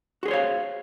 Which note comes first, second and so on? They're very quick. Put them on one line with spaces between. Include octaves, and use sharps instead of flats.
F#4 G#4 C5 C#5 F5